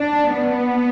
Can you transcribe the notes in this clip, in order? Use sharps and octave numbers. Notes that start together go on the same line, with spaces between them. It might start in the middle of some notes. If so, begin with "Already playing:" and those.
Already playing: D4
B3